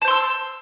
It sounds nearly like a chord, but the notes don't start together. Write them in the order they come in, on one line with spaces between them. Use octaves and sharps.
A5 C5 C6 E6